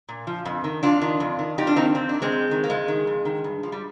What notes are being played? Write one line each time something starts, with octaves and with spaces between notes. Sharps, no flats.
A#2
F3
F2
D#3
F2 D4 F4
D#3
F2
D#3
F2 D#4 G4
D4 F4
D#3 C4 D#4
F2 C4
D#3 D4
G#3 C4
F2
D#3
A#3
F2 G#3
D#3
F2
D#3
G2
F3
G3